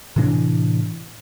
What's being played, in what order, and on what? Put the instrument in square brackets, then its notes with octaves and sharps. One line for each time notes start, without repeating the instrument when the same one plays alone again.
[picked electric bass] A2 C3 E3 D4